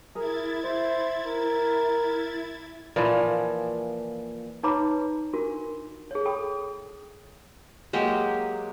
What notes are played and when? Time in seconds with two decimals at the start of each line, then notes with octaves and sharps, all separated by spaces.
0.15 E4 G#4 A#4 G#6 A6
0.64 C5 E5
1.26 A#4
2.96 A#2 E3 F3
4.63 D#4 B4 C#5 A#5 B5 D6
5.33 D4 F4 F#4 A#4
6.11 G#4 C#5
6.25 A4 C#5 G5 B5 D#6
7.93 F#3 G#3 A#3 G4